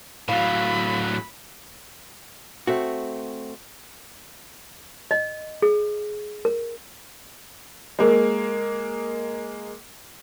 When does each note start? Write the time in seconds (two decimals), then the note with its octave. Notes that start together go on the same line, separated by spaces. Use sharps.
0.28 A2 F#3 F5 B5
2.67 A3 C4 F#4
5.11 D#5
5.62 G#4
6.45 A#4
7.99 G#3 A#3